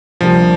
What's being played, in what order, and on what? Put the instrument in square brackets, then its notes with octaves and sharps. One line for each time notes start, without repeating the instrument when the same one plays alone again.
[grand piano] D2 C3 G3 A#3 D4 [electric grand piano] F3